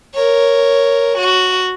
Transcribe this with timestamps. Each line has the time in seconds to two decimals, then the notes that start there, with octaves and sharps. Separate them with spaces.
0.14 A#4 C#5
1.18 F#4